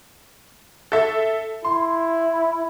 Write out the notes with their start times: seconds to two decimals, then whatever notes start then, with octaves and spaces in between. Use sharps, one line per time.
0.92 A4 E5
1.65 E4 C6